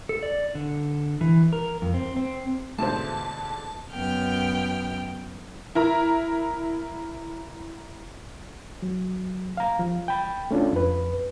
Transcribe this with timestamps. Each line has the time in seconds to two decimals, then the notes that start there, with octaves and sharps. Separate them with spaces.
0.09 A4
0.23 D5
0.55 D3
1.21 E3
1.53 A#4
1.82 F2
1.94 C4
2.16 C4
2.79 G#2 B2 D3 A3 C5 A5
3.93 F#2 B3 G5 F6
5.75 E4 A#4 A#5
8.82 F#3
9.57 F5 A#5
9.79 F3
10.08 G5 B5
10.51 A3 C#4 D4 F4
10.73 F2 B4